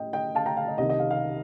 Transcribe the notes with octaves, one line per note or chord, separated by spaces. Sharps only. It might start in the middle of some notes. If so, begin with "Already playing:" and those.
Already playing: A2 G3 D#5 G5
D#5 G5
F5 A5
G5 A#5
F5
D#5
C2 C3 D#3 D#5
D#5
F5
F5